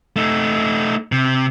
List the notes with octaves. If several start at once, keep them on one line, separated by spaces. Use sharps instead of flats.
A3 D#4
C3